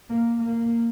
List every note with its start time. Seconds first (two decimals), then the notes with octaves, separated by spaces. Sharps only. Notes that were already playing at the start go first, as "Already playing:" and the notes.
0.10 A#3
0.42 A#3